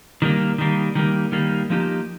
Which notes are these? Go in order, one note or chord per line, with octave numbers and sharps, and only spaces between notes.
D#3 G3 A#3
D#3 G3 A#3
D#3 G3 A#3
D#3 G3 A#3
F3 A#3 D#4 G4